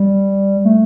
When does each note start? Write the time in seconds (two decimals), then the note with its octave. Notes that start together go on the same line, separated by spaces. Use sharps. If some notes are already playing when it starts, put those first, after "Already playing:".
Already playing: G3
0.65 A3